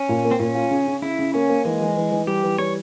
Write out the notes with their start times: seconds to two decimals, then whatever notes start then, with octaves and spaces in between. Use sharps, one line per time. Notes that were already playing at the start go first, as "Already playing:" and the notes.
Already playing: C#4
0.09 A#2
0.24 A#3
0.31 C4
0.39 A#2 C#4
0.55 F4
0.71 C#3
0.87 C#3
1.02 C#3 E4
1.19 C#3
1.34 A#3 C#4
1.49 A#3
1.65 E3 G#3
1.80 E3
1.97 E3
2.12 E3
2.27 G3 G4
2.44 E3
2.58 G3 C#5